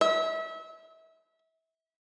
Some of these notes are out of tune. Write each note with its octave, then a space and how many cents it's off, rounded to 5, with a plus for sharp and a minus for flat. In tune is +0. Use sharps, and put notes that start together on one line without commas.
E5 -30